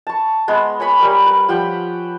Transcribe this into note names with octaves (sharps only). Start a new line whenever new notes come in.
A5 C#6
G#3 B3
C#5 G#5 B5 C#6
G3 A#4
B4
F3 G4 F#5 G5